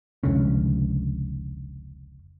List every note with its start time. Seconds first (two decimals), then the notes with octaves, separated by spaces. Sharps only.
0.24 F1 C#2 D3 C#4